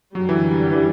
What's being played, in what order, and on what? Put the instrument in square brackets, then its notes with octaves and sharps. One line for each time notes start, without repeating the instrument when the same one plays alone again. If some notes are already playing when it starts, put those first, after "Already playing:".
[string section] F#2 D3 G3 [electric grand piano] F#3
[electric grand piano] E3
E3